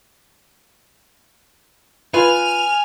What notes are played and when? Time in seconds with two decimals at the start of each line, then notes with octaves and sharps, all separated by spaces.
2.14 F4 B4 G#5 F6 F7